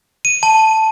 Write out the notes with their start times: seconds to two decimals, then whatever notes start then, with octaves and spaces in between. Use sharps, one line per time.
0.25 D#7
0.43 A5